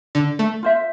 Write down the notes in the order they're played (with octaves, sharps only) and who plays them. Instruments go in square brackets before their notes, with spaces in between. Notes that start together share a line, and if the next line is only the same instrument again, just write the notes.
[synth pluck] D3
A3
[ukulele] F4 C5 E5